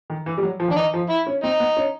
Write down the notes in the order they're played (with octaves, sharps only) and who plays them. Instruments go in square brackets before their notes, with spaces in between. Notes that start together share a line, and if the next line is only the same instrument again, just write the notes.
[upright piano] D#3
E3
G3
F#3
F3
D#3
[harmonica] D4
[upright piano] E3 [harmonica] D#4
[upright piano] F3
[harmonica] E4
[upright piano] C#4
[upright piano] C4 [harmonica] D#4
[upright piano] B3
C#4